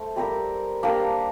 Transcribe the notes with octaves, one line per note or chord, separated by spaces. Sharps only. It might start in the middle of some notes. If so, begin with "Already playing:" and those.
Already playing: A3 C5
G3 C4 G4 A#4
A#3 D4 G4 A#4